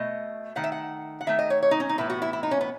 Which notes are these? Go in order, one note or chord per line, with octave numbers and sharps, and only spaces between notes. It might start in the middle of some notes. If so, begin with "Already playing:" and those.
Already playing: B2 A3 D#5
D#3 A3 F#5
E5
F#5
F#5
D#3 A3 E5
D#5
C#5
C#5
D#4
C#4
D#4
A2 E3 B3 E4
F#4
E4
E4
D#4
C#4
B3